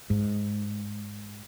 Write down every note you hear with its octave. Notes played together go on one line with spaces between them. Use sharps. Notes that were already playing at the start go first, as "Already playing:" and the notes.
G#2